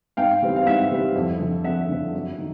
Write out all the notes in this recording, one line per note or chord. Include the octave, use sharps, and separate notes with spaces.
G#2 F5 G5
E3 G3 C4
F5
G#2 E5 F#5
E3 G3 C4
F2
D3 F3
F2 E5 F#5
D3 F3
F#2
D#3